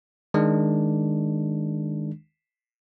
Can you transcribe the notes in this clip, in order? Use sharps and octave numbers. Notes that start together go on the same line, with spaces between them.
D#3 G#3 D4